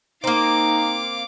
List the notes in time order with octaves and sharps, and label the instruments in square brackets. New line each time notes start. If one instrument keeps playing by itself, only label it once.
[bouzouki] A#3 C4 [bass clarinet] D#4 [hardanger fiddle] F5 D6